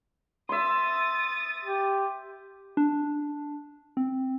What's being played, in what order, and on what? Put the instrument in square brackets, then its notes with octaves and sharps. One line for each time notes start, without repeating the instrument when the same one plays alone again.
[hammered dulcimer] E5 C6 [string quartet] D#6 A6
[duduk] G4
[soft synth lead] D4
C4